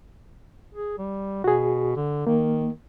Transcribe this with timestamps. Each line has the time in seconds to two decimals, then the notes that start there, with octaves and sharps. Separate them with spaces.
0.74 G#4
0.98 G3
1.44 B2 F#4 G#4
1.96 D3
2.27 D#3 A#3